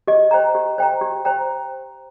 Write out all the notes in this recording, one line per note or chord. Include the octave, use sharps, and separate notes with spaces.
G4 D#5
C5 G5 A#5
G4
C5 G5 A#5
G4
C5 G5 A#5